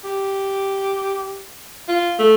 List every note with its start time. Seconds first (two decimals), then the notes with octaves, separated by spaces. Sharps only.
0.04 G4
1.88 F4
2.19 A3